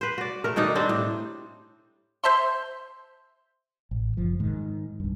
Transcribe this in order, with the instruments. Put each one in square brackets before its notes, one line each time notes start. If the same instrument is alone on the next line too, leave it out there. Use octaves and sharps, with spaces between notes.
[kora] B4 C5
F#4 D5
A3 A#4
B2 D#3 D4 D#4
G3 C4 D4
A2
[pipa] C5 E5 A5 C6
[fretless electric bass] A1
F#1 F3
G#2 D#3
B1 G2